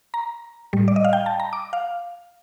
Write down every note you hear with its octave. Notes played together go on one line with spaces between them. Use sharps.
A#5
A2 G3
D5
D#5
F5
G5
A5
A#5
D6
F5